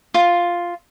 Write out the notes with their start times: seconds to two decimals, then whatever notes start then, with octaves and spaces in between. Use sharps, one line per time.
0.14 F4